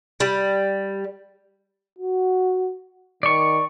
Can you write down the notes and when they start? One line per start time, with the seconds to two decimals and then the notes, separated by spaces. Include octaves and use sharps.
0.20 G3
1.99 F#4
3.23 D#3 D5 C#6